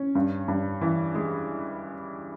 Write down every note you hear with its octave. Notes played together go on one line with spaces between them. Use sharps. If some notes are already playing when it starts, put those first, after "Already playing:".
Already playing: C#4
G2
G2
E3
G#3